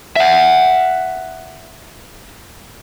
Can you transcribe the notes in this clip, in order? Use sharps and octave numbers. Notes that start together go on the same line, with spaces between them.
E5 F#5